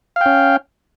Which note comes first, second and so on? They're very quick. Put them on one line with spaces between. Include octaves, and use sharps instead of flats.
F5 G5 C#4